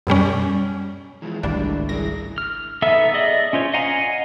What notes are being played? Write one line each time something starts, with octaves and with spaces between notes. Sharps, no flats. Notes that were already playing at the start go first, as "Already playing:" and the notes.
F#2 B2 G3 C#4
E3 F3 G#3
G#1 C#2 A2 G3 D4
E4 G#4 A#4 A#6
F6
B3 D#4 A4 E5 A5
G#4 D5 D#5
C#4 F4 C5 C#5
D#5 F5 F#5 G#5 A#5